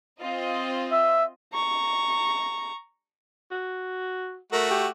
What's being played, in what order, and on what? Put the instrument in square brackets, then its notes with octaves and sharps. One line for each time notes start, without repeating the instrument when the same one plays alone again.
[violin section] C4 F4 D#5
[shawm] E5
[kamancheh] A#5 C#6
[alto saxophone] F#4
[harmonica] A3 F#4 [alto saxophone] A#4
[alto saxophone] G4